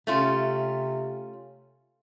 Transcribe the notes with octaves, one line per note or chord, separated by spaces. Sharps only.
C3 A3 C#4 F4